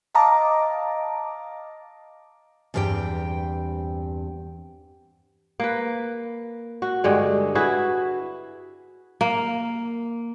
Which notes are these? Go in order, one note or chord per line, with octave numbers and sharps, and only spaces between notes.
D#5 F5 A5 A#5 D6
E2 G2 C4 G4 G5
A#3 B4
F#4
G2 D3 G#3
E4 F#4 G#4 B4
A#3